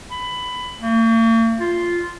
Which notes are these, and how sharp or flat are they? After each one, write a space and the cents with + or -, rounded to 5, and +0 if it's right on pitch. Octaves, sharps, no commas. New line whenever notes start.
B5 +15
A#3 -45
F4 -5